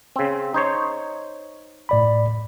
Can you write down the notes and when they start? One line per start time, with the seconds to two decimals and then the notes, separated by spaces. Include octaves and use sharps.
0.16 C#3 C4
0.54 D#4 C5 C#5
1.89 A2 D5 B5